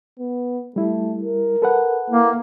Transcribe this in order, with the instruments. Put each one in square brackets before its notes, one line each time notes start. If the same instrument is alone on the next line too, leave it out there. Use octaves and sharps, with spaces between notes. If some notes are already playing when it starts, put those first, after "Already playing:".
[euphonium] B3
[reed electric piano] G3 E4 [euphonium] A3
[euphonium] A#4
[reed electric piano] A4 B4 F#5
[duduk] A#3 [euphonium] E4